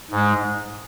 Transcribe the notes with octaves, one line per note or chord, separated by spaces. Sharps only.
G#2 G#3